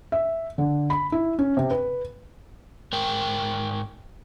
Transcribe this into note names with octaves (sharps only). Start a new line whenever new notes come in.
E5
D3
B5
E4
C#4
C3
B4
G#2 A#4 G5